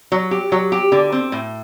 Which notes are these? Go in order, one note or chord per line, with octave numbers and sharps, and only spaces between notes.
F#3
G4
F#3
G4
D3
C4
A2